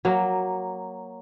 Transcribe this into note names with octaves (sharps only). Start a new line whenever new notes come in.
F#3 A#3